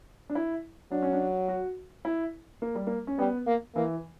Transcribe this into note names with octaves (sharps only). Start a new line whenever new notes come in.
D4
E4
F#3 D4
C#4
D4
F#4
E4
A#3
G3
A#3
C#4
G3 B3
A#3
E3 A#3